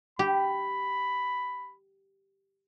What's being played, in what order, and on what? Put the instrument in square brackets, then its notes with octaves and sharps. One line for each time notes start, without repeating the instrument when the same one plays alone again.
[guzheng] G4 [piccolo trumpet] B5